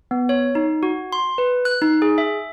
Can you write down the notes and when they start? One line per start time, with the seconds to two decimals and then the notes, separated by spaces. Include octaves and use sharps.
0.11 B3
0.29 C#5
0.55 D#4
0.83 F#4
1.13 C6
1.38 B4
1.65 F#6
1.82 D#4
2.02 G#4
2.18 E5